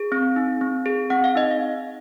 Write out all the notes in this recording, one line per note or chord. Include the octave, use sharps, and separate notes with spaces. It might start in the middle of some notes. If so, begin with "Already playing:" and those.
Already playing: G#4
C4
D#4
C4
G#4
C4 F#5
F5
D#4 D#5
F5